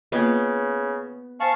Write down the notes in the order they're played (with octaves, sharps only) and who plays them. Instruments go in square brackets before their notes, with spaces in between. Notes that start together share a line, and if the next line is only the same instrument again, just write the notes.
[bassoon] C#3 [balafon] A#3 F4 D#5 [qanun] B3
[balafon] C5 G#5 [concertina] F5 A5 C#6